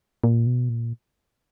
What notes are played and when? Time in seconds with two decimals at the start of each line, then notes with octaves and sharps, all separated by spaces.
0.24 A#2
0.47 B2
0.69 A#2